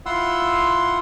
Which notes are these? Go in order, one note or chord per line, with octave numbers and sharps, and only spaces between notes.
E4 F4 F#5 C6 E6